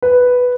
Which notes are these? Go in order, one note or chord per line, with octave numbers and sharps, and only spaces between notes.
B4